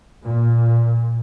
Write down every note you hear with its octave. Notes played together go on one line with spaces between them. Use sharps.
A#2